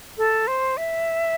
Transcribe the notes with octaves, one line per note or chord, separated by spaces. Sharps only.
A4
C5
E5